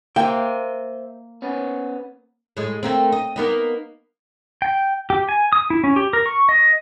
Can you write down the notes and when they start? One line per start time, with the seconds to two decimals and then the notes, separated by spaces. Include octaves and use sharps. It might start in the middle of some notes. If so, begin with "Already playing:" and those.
0.16 A#3 C5 E5 G5
1.42 B3 C#4
2.57 A2 G#3
2.83 A3 A#3 C4
3.12 D#5
3.36 A#3 B3 D#4
4.62 G5
5.10 G4
5.29 G#5
5.53 D#6
5.70 E4
5.84 C#4
5.96 G4
6.13 A#4
6.26 C#6
6.49 D#5